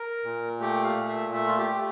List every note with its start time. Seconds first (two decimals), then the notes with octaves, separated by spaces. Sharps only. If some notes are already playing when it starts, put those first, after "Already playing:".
Already playing: A#4
0.24 A#2
0.60 A3 G4
0.84 F5
0.96 A#2
1.08 E5
1.33 A3 E5
1.47 F4
1.58 G4
1.69 A3